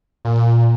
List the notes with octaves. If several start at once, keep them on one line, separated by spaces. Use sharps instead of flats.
A#2